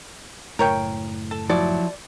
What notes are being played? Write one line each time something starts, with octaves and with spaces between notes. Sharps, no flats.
F#1 A2 A#4 C#5 G5
A4
F3 F#3 E4 D5